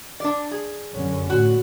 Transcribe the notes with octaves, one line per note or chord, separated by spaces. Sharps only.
D4 D5
G#4
F#2 D3 C#4
A2 F#4